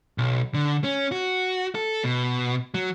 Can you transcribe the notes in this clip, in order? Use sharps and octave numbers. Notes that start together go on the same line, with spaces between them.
B1
D3
C#4
F#4
A4
B2
F#3